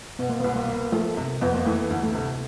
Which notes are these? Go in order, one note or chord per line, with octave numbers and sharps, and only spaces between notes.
B2 B3
A#3
B3
C2
A#3
A#3
F3 A3
C3
F2 B3
A#3
E3 A3
D2
A3
C3